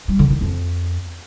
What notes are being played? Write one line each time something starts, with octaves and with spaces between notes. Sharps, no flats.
G3
D3
D#3
F2